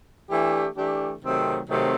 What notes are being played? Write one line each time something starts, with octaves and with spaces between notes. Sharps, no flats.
E3 A3 D4 G4
E3 A3 D4 G4
C3 D#3 F#3 A3 C4
C3 D#3 F#3 A3 C4